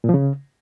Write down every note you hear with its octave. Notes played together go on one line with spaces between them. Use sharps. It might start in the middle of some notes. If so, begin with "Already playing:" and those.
A#2
F3
C#3